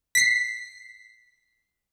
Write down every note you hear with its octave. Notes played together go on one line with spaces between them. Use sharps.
B6 C7